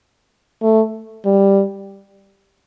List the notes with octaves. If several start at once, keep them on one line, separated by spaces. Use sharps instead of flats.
A3
G3